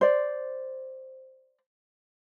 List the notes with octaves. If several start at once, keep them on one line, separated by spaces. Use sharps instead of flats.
C5 D5